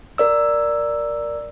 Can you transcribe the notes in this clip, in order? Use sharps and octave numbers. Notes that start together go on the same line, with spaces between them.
A#4 D5 E6